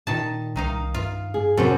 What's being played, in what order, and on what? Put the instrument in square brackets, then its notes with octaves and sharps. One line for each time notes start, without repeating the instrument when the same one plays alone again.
[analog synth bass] A#2 [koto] D#3 A5
[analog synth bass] C2 [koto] D#3 D#4 F5
[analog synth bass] G2 [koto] F4
[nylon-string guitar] G#4
[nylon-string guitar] F#2 C3 F#3 [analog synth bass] B3 [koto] A4